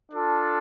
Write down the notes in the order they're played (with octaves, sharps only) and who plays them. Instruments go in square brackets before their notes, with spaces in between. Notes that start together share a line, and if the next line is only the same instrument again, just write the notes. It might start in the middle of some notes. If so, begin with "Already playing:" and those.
[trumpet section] D4 F4 A4